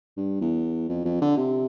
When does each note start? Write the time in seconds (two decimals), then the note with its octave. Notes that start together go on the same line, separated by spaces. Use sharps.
0.17 G2
0.41 E2
0.89 F2
1.05 F2
1.21 D3
1.37 C3